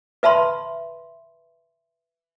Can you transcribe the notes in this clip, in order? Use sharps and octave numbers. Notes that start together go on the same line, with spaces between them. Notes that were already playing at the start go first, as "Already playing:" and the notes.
B4 E5 A5 B5 C6